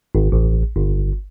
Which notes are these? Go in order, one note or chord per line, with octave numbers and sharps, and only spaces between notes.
G#1
A1
G1